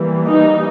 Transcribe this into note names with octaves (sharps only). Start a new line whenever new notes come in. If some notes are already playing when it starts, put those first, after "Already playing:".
Already playing: E3 G3 A#3
D#4